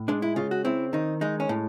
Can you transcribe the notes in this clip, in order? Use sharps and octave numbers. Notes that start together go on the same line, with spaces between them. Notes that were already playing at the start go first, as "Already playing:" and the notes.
Already playing: A2
G#3 D4
E4
C#3 F4
F#4
C4 E4
D#3 D#4
G#3 D#4
C#4
A2